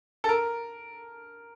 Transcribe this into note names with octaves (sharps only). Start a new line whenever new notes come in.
A4
A#4